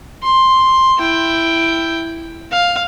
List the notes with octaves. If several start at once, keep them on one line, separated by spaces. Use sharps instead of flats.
C6
E4 G5
F5